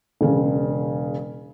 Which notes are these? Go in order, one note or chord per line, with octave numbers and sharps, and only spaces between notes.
E1 C#3